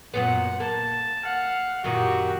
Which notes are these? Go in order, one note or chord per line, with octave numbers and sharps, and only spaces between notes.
F#2 A#2 B3 F#5
A#3 A5
F5 F#5
F#2 A#2 D#3 F#4 G4